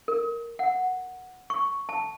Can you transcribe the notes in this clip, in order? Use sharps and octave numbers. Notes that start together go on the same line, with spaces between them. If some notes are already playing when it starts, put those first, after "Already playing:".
A#4
F#5
C#6
A5